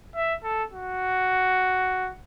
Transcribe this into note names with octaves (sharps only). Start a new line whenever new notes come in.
E5
A4
F#4